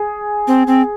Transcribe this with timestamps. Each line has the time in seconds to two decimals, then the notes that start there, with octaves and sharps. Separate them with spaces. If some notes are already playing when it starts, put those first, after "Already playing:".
Already playing: G#4
0.47 C4
0.67 C4